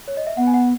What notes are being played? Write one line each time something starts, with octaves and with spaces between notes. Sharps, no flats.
C#5
D#5
E5
B3 F#5
G#5
F#5